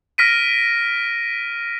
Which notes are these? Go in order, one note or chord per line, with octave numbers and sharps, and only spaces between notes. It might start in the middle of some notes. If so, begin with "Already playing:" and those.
F6 A#6 B6 D7 D#7